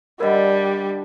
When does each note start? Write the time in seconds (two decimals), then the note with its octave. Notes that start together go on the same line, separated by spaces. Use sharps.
0.20 D3 G3 E4 A#4 D#5